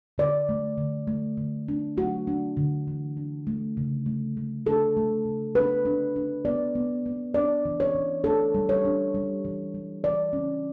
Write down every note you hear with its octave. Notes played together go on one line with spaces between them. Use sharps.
D3 D5
A3
D3
A3
D3
D4
A3 F#4
D4
D3
E3
D4
A3
C#3
A3
A3
D4 A4
A3
C#3
D4 B4
D4
D4
B3 D5
B3
B3
D4 D5
E3
C#5
E3
D4 A4
G3
C#5
D4
G3
E3
G3
E3 D5
C#4